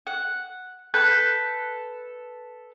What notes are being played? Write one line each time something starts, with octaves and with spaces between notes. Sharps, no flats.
F#5
A4 B4 F#6 G6